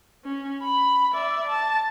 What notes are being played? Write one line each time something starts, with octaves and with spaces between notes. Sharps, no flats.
C#4
B5
D5 E5
A5